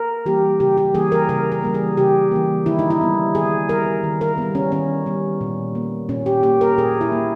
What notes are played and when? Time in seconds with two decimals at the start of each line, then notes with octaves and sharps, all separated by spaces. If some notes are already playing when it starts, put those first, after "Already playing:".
Already playing: A#4
0.26 E3 G3 A#3 G4
0.60 C#3 G4
0.77 G4
0.95 E3 G3 A#3 G#4
1.12 A#4
1.29 C#3 A#4
1.52 A#4
1.63 E3 G3 A#3
1.74 G#4
1.97 C#3 G4
2.31 E3 G3 A#3
2.66 D#3 E4
2.79 D#4
2.90 E4
3.01 G3 B3
3.35 D#3 G#4
3.69 G3 B3 A#4
4.03 D#3
4.21 A#4
4.38 G3 B3
4.55 C#4
4.72 D#3 C#4
5.06 G3 B3
5.41 A#2
5.75 A#3
6.09 A#2 C#4
6.26 G4
6.43 A#3 G4
6.61 A#4
6.78 A#2 G#4
7.01 E4
7.12 A#3